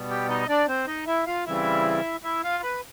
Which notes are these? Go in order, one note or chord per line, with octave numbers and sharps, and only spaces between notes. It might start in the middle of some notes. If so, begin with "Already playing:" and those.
Already playing: B2 G3 B3
G4 G5
D#4 D#5
D4 D5
C4 C5
D#4 D#5
E4 E5
F4 F5
C#3 E3 G3 C4 E4 E5
E4 E5
F4 F5
B4 B5